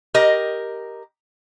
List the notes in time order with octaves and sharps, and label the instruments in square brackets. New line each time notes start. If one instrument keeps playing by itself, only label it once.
[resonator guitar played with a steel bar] G4 A#4 D#5